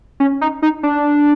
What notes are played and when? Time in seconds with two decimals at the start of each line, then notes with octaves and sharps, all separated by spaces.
0.20 C#4
0.41 D#4
0.62 D#4
0.83 D4